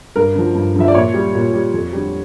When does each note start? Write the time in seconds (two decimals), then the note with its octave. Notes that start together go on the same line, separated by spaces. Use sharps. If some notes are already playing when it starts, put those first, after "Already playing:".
0.16 G2 A#4
0.35 D3 F3
0.55 G2
0.76 D3 F3 E5
0.88 D5
0.95 A#2 C#5
1.14 G3
1.35 A#2
1.53 G3
1.74 F2
1.93 D3 G3